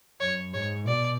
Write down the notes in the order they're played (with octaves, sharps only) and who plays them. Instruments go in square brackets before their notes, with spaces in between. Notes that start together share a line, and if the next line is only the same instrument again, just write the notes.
[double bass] F#2 [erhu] C#5
[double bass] G#2 [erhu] C#5
[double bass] B2 [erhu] D5